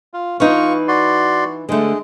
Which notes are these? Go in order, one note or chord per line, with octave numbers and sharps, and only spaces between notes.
F4
E3 D#4 F4 C#6
F#4 D5 C6
D3 G#3 A3